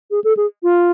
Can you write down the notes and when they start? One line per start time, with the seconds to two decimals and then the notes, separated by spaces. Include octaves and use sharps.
0.11 G#4
0.24 A4
0.37 G#4
0.63 F4